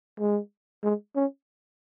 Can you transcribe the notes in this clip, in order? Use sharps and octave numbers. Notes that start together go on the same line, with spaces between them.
G#3
G#3
C#4